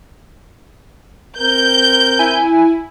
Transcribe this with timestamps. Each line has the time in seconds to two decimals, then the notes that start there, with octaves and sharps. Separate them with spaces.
1.38 C4 A#4 G6
2.19 E4 G#5